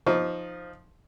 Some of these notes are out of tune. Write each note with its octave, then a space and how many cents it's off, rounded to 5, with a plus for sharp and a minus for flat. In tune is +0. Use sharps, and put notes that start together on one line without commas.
F3 +0 D#4 +0 C#6 +45